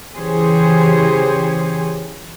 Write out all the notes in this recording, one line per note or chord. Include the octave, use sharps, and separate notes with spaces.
C#3 E3 G4 G#4 C5 C#5